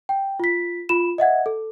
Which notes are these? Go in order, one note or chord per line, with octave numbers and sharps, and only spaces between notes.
G5
F4 B6
F4 B5 E7
D#5 E5 F#5 G#6
A4